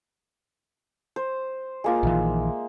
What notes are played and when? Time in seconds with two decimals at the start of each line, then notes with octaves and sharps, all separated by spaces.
1.16 C5
1.84 G#3 A#3 F4
2.03 A#1 D#3 E3 E5